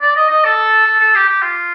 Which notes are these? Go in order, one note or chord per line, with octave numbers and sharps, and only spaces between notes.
D5
D#5
D#5
A4
A4
A4
G4
G4
F4